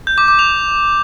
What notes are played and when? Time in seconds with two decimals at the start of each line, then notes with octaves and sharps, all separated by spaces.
0.07 G6
0.18 D6
0.28 D6
0.39 F7